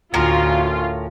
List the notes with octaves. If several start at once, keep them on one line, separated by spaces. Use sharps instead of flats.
D2 A2 C#4 F4 A#4